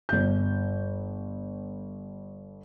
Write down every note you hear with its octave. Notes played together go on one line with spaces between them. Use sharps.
G1 G6